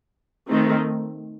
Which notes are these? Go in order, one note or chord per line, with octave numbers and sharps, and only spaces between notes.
D#3 A3 C4 D#4